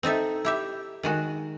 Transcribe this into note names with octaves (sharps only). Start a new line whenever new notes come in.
C4 D#4 A4 E5
E4 G4 E5
D#3 G#3 F#4